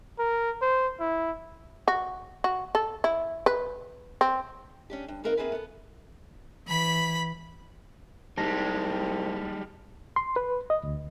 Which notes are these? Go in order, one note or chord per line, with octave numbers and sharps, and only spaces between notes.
A#4
C5
E4
F#4
F#4
A4
E4
B4
C4
C#4 D4 G4
G2
D#3 A#3 C4 A#4 B4 F5
C3 A#3 C4 E4 G#4 B4
B3 A4
E3 B5 B6
C2 G3 G#3 D#4 A5 A#6
C6
B4
D#5
D2